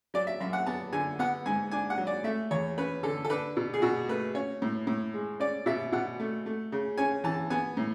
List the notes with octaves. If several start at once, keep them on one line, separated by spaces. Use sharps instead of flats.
F#3 D5
E5
F#2 E5
F#5
B3 A5
D3 G#5
B3 F#5
G#2 G#5
D4 G#5
F#5
F#3
D5
A3 E5
E2 C#5
C#4 B4
D3 A4
A4
D4 B4
B2
G#4
B2 F#4
A3 B4
C#4 C#5
A2
A2
G#3
C#4 D5
B2 E5
B2 F#5
A3
A3
C#3
C#4 G#5
E3 A5
B3 G#5
A2